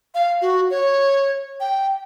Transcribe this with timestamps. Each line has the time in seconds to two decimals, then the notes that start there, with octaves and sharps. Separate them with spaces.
0.15 F5
0.42 F#4
0.71 C#5
1.60 G5